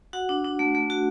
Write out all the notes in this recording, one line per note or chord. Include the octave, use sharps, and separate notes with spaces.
F#4 F#5
D4
D4
A3
A3
F#4